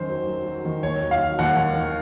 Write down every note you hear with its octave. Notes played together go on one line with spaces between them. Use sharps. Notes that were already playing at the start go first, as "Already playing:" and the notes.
Already playing: F#2 D#3 C5
F#3
F#3
F#3
D#3
D#2 C#5
F#3
F5
F#3
D#2 F#5
D#2
D#3